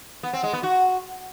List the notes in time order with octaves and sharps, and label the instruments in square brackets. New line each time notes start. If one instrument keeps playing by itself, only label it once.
[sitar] B3
C4
G#3
B3
F#4